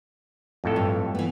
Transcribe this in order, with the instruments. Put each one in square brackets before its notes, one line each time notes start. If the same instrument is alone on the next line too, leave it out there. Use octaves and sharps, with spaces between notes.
[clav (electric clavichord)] F2 A2 A4
[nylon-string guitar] G2
E3 B3